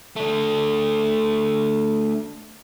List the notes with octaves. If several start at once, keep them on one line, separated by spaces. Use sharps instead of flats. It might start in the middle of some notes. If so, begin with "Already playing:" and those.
A3 D4